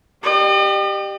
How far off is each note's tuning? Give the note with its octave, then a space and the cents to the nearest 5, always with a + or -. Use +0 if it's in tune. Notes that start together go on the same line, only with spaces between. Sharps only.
G4 +0 D#5 -45